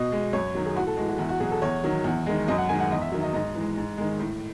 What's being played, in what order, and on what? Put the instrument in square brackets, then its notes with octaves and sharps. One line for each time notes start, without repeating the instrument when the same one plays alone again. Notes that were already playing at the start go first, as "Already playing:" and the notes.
Already playing: [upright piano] B2 D#5
G#3
F#2 C#5
D#3 F#3
G#4
A2 F#4
A4
E3 G#3 F#4
F#4
E2 E4
F#4
B2 F#3 G#4
A4
E2 C#5
D#3 F#3
E2
D#3 G#3
F#2 D#5
F#5
D#3 G#3 G#5
F#5
E2 D#5
E5
D#3 F#3 E5
D#5
G#2 D#5
E3
G#3
G#2
D#3 G#3
A2